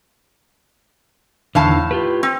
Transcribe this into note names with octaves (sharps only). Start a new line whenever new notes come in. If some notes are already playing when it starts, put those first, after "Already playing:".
E2 A2 D3 D#3 F5 A5
F4 G4 B4
C4